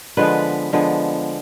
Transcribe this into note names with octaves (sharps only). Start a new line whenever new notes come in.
D3 F3 G#3 B3 B4
D3 F3 G#3 B3